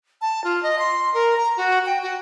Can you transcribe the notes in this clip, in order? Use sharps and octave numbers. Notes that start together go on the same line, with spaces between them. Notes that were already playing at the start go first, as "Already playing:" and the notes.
A5
F4
D#5
C6
A#4
A#5
F#4
G5
F#4